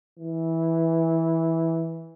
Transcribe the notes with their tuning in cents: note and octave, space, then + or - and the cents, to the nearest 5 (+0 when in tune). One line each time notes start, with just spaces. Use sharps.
E3 -10